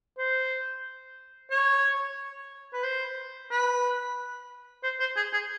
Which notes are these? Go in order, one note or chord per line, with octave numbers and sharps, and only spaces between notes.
C5
C#5
B4
C5
B4
C5
C5
G#4
G#4